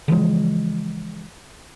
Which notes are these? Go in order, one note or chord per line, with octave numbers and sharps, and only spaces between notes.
C#3 E3 F3 G#3